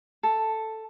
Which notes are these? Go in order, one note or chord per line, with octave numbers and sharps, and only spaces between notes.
A4